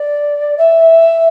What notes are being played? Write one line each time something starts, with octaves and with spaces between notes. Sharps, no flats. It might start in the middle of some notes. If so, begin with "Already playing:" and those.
Already playing: D5
E5